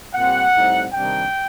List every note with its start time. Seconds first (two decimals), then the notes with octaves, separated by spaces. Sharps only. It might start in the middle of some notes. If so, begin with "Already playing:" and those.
0.15 A#2 G3 C4 F#5
0.54 A2 G3 C4 D#4
0.93 C3 D#3 G3 D4 G5